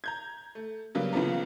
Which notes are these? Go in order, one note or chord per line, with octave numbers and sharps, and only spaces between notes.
A#5 G6 G#6
A3
C#3 F#3 G3 A#3 B3
B1 C#3 E3 F3 B3 A#5